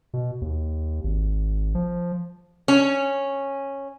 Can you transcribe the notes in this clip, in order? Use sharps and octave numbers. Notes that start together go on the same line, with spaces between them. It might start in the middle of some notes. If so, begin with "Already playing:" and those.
B2
D#2
G#1
F3
C#4